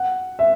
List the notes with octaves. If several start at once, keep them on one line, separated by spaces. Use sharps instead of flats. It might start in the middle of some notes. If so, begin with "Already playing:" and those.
Already playing: F#5
E5